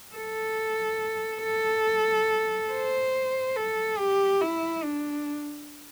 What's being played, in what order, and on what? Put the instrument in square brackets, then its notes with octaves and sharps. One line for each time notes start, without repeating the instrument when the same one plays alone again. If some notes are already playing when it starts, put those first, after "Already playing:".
[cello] A4
A4
C5
A4
G4
E4
D4